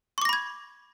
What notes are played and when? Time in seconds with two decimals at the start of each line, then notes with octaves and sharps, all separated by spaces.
0.18 C#6
0.22 D6
0.25 A#6
0.29 B5
0.33 G#6